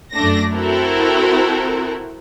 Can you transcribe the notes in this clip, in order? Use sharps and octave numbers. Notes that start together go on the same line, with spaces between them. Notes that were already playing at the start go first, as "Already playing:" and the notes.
F#2 A3 D4 A#6
C4 E4 F#4 A4 A#4